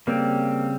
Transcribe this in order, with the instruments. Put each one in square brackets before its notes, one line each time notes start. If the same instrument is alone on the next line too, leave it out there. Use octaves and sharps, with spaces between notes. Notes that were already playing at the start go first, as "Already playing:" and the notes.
[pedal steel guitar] C#3 G3 C4 [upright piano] A#3